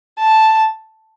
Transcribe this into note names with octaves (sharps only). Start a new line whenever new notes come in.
A5